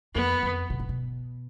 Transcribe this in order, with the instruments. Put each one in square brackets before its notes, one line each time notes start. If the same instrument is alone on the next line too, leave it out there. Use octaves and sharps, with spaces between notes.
[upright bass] F2 [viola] B3
[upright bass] F2
B2
A#2
B2